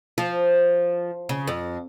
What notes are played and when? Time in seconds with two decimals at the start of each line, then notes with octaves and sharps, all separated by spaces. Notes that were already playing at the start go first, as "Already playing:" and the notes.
0.18 F3
1.29 C#3
1.48 F2